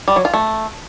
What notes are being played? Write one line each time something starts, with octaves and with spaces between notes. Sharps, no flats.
G3
F#3
F4
A3